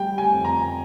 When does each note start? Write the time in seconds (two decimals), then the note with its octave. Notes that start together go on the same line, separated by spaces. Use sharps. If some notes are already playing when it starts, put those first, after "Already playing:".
Already playing: G3 G5
0.18 G#5
0.32 F2
0.45 A#5